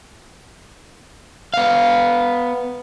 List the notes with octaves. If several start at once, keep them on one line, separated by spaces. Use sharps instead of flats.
B3 F5